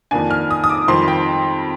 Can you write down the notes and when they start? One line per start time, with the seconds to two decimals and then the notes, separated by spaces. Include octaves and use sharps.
0.11 F2 D#3 A#3 D4 G#5
0.31 F6
0.51 D#6
0.64 D#6
0.69 D6
0.88 F2 D#3 G3 C4 C6
1.08 G5